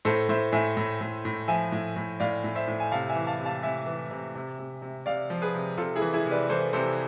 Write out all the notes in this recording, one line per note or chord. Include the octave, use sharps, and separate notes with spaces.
A2 A4 C5
A2 C5 E5
A2 E5 G#5
A2
A2
A2
F3 E5 G#5
A2
A2
A2 D5 F5
A2
C5 E5
A2
G#5
C3 F5 A5
E5 G#5
E3
F5 A5
C3
F5 A5
C3 E5 G#5
E3
C3
C3
C3
C3
C3 D5 F5
F3
G#4 B4
C3
C3 F4 A4
E4 G#4
E3
E4 G#4
C3
B4 D5
E3 A4 C5
C3 A4 C5